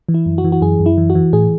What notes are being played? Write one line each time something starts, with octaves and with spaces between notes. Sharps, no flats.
E3
E4
F#2
F#4
E3
F#4
F#2 G#4
F#2
E4
E3
F#4
E3
A2 G#4